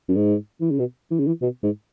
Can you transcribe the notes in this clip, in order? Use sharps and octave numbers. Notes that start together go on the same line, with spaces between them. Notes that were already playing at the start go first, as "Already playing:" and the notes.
F#2
G#2
E3
C#3
B2
E3
C#3
E3
B2
G#2